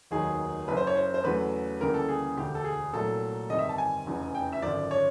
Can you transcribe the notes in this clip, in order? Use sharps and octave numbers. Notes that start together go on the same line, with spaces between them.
F1 D#2 D#3 F#3 G#4
F#1 F#2 C#3 B4
C5
C#5
C5
C5
E2 C#3 F#3 A3 B4
D2 C#3 E3 G3 A#3 A#4
A4
G#4
E1 D2 D3 G4
A4
G#4
C2 A#2 F#3 A3 A4
G1 F2 C3 D#3 G3 D#5
E5
A5
G#5
F1 E2 C#3 F3
G5
E5
G#1 F#2 D3 F3 D5
C#5